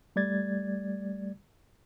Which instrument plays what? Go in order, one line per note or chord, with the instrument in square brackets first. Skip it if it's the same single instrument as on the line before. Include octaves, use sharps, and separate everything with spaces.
[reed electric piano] G3 A3 D5 G#6 A6